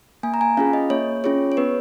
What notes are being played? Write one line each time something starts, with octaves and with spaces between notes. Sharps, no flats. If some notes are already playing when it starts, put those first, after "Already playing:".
A#3 G#5
A#5
G#5
C#4 F4 G#4 F5
D#5
A#3 C#5
C#4 F4 G#4 C#5
C#5
B3 B4